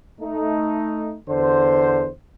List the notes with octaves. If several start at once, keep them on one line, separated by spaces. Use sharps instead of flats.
A3 D#4
E2 D3 C5